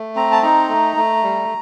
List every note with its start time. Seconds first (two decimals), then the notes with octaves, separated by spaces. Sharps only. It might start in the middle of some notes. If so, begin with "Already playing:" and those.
Already playing: A3
0.16 C4 A#5
0.32 A5
0.42 D#4 A#5
0.69 A3
0.96 A3
1.23 G3